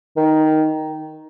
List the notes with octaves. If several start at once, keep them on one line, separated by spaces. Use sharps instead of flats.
D#3